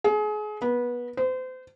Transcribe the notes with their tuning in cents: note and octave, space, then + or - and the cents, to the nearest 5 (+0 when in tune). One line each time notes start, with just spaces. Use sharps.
G#4 +30
B3 -20
C5 -35